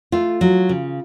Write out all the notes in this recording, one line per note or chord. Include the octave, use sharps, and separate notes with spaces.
A3 F4
F#3
C#3